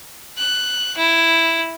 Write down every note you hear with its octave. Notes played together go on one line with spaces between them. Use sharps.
F#6
E4